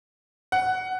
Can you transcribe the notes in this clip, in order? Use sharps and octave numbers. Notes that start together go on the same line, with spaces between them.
F#5